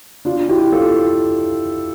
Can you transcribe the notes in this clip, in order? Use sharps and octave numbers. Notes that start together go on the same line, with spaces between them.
D4 F4
E4 G4
F4 A4